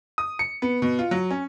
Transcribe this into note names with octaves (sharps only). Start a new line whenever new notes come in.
D#6
C#7
B3
B2
F4
F#3
C#4